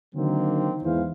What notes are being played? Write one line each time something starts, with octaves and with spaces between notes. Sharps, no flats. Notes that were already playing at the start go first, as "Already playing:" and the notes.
D3 D#3 F#3 A#3 C4
E2 G#2 E3 C5 F5